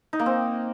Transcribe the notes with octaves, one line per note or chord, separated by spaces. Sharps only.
D#4
A#3
C4